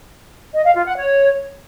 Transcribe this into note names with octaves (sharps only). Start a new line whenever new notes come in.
D#5
F5
F4
F#5
C#5